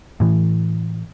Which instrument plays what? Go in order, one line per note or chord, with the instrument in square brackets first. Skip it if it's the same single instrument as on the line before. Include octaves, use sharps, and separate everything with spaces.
[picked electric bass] A2 E3